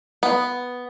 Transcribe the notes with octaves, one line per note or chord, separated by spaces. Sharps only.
B3